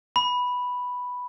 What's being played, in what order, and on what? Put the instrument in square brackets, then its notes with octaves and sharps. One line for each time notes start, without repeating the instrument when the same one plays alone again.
[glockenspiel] B5